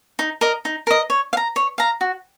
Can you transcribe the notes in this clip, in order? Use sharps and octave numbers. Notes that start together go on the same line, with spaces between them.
D#4
A#4 D#5
D#4
A#4 D#5
C#5
F5
A#5
C#5
F5 A#5
F#4